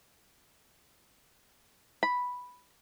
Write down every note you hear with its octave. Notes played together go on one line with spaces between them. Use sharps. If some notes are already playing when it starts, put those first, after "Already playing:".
B5